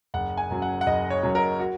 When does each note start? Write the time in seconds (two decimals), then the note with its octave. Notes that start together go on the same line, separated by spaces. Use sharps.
0.14 F#1 F#5
0.37 G#5
0.50 F#2 F#3
0.62 F#5
0.81 F#5
0.86 F#1 D#5
1.10 C#5
1.23 F#2 F#3
1.35 A#4
1.59 F#4